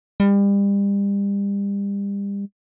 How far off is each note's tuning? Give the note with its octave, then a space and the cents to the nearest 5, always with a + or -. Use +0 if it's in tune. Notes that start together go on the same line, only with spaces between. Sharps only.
G3 +35